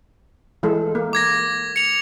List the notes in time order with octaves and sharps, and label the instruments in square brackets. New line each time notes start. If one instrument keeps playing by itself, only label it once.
[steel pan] E3 G#3 A4
A#3
[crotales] D6 G#6 A#6
C#7 F7